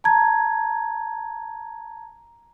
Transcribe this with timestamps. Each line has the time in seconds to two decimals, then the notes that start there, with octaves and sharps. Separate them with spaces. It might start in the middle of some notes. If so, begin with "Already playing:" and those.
0.04 A5 A#5 G#6